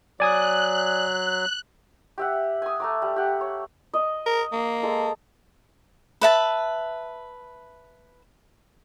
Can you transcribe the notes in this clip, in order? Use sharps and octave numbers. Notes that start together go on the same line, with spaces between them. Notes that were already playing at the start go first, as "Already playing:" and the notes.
F#3 D5 G#5 D#6 F#6
G4 E5 F#5
G#5 D#6
A3 A#5 D6
G3
G4 F#5
C#5
D#5
A#4
A#3
G#3 A4
B4 E5 A5